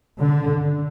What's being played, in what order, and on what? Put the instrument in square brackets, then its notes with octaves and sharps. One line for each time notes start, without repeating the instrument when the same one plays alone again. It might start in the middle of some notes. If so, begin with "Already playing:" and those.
[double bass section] D3